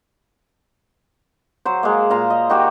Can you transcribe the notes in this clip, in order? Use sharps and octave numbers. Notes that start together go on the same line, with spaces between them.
F#3 C5
G#3 A#3
A#2 F5 A#5 C6
D#5
D#3 D#4 F#4 G4